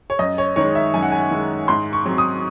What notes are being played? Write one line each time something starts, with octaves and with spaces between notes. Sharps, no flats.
C#5
F#2 D#5
C#5
D#3 G#3 C#5
E5
F#2 G#5
F#5
G#5
D#3 G#3
G#2 C6
C#6
F#3 C4
D#6